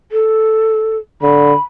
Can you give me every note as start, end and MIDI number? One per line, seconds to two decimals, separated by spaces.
0.12 0.97 69
1.22 1.53 50
1.22 1.62 83